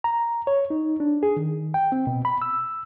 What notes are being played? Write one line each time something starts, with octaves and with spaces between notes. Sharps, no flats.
A#5
C#5
D#4
D4
G#4
D#3
G5
C4
B2
B5
E6